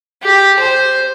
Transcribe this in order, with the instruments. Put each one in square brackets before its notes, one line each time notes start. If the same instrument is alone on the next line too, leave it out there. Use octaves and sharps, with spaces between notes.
[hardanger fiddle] G4
C5